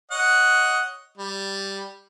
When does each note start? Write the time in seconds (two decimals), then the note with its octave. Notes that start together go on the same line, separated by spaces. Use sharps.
0.11 C#5 D#5 F#5
1.18 G3